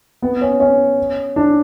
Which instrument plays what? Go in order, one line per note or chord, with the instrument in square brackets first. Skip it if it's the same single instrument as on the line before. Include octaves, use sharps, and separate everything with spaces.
[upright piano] B3
C#4
C#4
D4